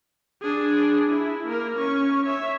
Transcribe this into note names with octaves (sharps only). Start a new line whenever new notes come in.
D4 G#4
E4
A#3 A#4
C#4 C#6
C#5 E5